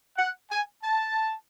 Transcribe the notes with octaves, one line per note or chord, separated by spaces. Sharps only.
F#5
G#5
A5